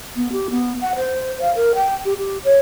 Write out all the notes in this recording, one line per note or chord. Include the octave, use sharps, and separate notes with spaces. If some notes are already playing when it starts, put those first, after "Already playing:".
B3
G4
B3
F#5
C5
F5
A#4
G5
G4
G4
C#5